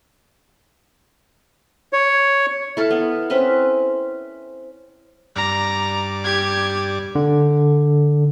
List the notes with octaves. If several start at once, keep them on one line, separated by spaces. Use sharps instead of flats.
C#5
E4 A4 F5
B3
C4 C#4 E4 B4
G2 D5 A#5
G4 G#6
D3